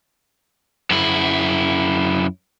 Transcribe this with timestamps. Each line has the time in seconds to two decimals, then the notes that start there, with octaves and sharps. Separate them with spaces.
0.91 F#2 E4